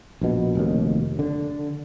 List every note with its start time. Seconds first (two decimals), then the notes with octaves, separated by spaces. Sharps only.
0.21 A#1 B2
0.55 F1 D#2
1.19 D3